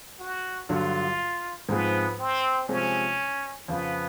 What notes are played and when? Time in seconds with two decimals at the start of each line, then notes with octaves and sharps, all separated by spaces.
0.19 F#4
0.69 G2 D3 F#3 F4
1.69 G#2 F3 G#3 B3 C4
2.19 C4
2.69 C3 F3 G#3 C4 C#4
3.68 F2 C#3 F3 B3